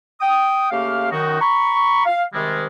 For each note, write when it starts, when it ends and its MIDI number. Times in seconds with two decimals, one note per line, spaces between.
0.21 0.69 79
0.21 0.69 87
0.71 1.10 49
0.71 1.10 57
0.71 1.10 58
0.71 1.10 67
0.71 1.10 77
1.12 1.40 42
1.12 1.40 51
1.12 1.40 63
1.12 1.40 66
1.41 2.04 82
1.41 2.04 83
1.41 2.04 85
2.06 2.23 77
2.33 2.67 48
2.33 2.67 51
2.33 2.67 55
2.33 2.67 56